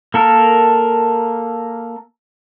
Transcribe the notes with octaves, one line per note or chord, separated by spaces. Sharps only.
A#3 A4 A#4